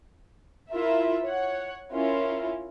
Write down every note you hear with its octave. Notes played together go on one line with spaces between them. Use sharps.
E4 F4 A#4 E5
C#5 F#5
C#4 E4 F4 A#4